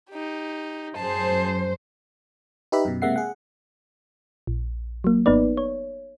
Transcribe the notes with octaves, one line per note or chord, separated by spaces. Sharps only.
D#4 G4
F#2 G#4 C5 A5
D#4 G4 B4 E5 B5
F#2 B2
C3 G#3 A#3 E5 F#5 C7
G#4 F#5
A#1
F#3 A#3
G#1 B3 D#4 B4 D5
C#5